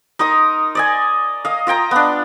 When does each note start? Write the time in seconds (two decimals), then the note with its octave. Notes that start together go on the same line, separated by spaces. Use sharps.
0.19 D#4 A#4 C6 D#6
0.75 D5 D#5 G#5
1.45 D#5 F5
1.67 F4 D#5 G5 A#5
1.91 B3 D4